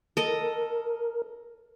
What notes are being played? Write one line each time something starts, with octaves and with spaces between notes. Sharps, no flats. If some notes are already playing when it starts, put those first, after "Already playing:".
A4 A#4 D#5